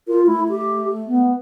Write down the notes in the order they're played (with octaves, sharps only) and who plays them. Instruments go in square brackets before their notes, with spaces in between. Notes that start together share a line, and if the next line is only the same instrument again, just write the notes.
[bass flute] F4 [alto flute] A#4
[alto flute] A3 [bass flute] E4
[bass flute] G4
B3